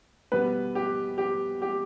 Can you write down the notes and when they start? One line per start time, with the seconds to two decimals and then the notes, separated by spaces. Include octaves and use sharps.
0.32 E2 B2 G3 B3 B4
0.75 G4
1.18 G4
1.62 G4